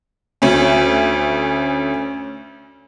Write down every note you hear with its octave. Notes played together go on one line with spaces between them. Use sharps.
D2 C#4